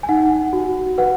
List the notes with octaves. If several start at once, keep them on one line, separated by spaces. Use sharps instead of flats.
G#5
D#4 F#5
F#4
B4 F#5